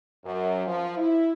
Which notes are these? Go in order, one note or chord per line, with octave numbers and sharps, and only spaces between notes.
F#2
F3
E4